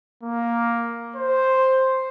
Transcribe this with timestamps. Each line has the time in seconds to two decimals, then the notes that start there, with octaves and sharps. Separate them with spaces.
0.23 A#3
1.16 C5